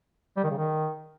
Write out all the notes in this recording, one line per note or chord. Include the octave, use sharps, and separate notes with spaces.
G3
D#3
C#3
D#3